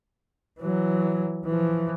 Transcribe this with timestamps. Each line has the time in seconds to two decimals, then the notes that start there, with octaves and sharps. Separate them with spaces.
0.60 E3 F#3
1.46 E3 F3